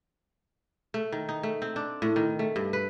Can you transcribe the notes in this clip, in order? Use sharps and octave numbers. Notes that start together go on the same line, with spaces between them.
A3
D#3
D#4
A3
C4
D4
A2
D#3
A3
G2
B4